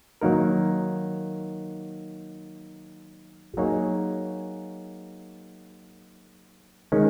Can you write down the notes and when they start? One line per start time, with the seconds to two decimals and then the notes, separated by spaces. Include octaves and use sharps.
0.21 D#3 F#3 A#3 D#4 A#4
3.57 F#3 A#3 D#4 G#4 C#5
6.92 D#3 G#3 C#4